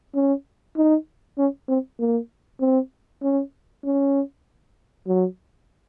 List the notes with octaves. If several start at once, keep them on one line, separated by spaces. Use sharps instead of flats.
C#4
D#4
C#4
C4
A#3
C4
C#4
C#4
F#3